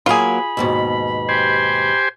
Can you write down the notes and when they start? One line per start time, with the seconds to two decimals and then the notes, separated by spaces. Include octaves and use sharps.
0.06 F#3 A#3 F4 G#4 B5
0.57 D#2 G#2 B2
1.29 G4 C5 G#5